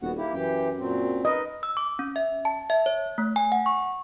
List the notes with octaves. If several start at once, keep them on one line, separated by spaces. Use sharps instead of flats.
D#1 B3 F#4 F#5
A#3 E4 G4
F#2 E3 G4 G5
A#2 F#3 C4
D#4 A#4 B4 D#5
E6
D6
C#4
E5
A5
E5
C#5
A3
G#5
F#5
C#6